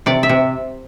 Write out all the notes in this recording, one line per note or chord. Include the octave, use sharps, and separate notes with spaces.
C3 D5
E5
C3